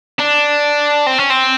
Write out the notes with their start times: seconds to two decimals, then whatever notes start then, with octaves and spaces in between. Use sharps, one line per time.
0.19 D4
1.07 C4
1.19 C#4
1.30 C4